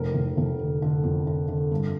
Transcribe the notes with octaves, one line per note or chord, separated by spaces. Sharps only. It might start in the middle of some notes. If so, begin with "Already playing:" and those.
Already playing: F1 A#4
F1
F1
D3
D3
F2
D3
D3
G2